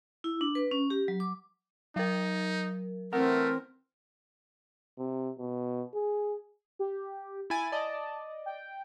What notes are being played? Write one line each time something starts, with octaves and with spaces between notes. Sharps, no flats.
E4
D4
B4
C#4
G4
F#3
D6
F#3 D#4 A#4
E3 A3 C4 A#4 F#5
C3
B2
G#4
G4
E4 G#5 A6
D5 D#5 A5
G5